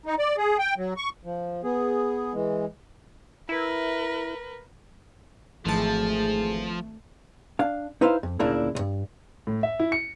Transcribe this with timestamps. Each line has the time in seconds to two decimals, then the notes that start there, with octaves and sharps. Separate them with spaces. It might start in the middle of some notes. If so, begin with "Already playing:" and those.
0.06 D#4
0.18 D5
0.37 G#4
0.59 G5
0.77 F#3
0.97 C#6
1.25 F3
1.64 B3 G#4
2.33 E3 G#3
3.49 E4 A#4 B4
5.65 G#1 E3 F3 A3 G#4 A5
7.59 D4 F5
8.01 D#4 E4 B4 C5 E5 F5
8.23 F2
8.39 D2 A#2 C#3 A#3 D4 E4
8.75 B1 G2
9.47 A2
9.63 E5
9.80 E4
9.92 C#7